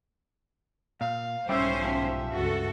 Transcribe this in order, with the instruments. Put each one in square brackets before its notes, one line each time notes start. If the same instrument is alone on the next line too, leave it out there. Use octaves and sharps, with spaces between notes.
[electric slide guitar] A#2 [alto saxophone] F5
[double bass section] B1 G#2 [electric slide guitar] G3 A3 E4 [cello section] C#4 C5 [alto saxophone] E5
[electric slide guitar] F3 G4
[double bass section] C#2 G2 [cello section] F#4 A4